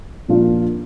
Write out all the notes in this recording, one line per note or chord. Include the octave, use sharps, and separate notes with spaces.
A#2 F3 A#3 D4 F4